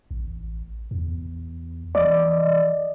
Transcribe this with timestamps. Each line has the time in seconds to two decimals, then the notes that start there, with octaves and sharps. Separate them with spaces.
0.11 A1
0.91 E2
1.95 E3 D5 D#5